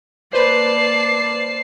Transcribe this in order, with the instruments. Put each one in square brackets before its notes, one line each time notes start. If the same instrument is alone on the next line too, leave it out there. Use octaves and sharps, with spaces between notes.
[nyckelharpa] A#3 D5 [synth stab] B4 C5 [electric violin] A5 C7